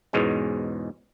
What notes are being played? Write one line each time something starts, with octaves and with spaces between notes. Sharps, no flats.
E2 G#2 B2 G#3 C#4